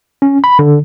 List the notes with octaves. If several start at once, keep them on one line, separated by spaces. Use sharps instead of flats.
C#4
B5
D3